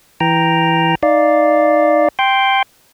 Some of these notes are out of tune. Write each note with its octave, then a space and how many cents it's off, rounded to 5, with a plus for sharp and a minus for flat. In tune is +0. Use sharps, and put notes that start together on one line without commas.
E3 +0 G5 +0 A#5 +0
D#4 +0 D5 +0 F5 +0
G5 +0 C6 +0